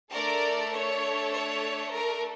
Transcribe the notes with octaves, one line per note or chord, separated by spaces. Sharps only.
A3 D4 A4 A#4 D5
C#5
C#5
A#4